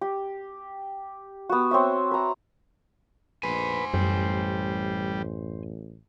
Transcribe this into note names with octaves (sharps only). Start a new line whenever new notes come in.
G4
B3 F#4
C4 C#5 E5
B4 A#5
A#1 B4 C5 G#5
A1 F#2 G3